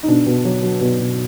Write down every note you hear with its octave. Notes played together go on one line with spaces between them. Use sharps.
D#4
B2 D4
B2
F#3
F#3
B2
B2